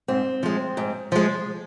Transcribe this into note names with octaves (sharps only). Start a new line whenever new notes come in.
G#2 C4
F3 G#3
G#2
F3 G#3